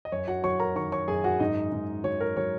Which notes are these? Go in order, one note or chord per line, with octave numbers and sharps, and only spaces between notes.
D#5
F#2 C#5
F#4 F#5
F#3 C#5 C#6
A#4 A#5
D#3 C#5 C#6
C#5 C#6
F#2 G#4 G#5
F#4 F#5
G#2 D#4 D#5
G#2
F#3 C#5
A#4
F#3 C#5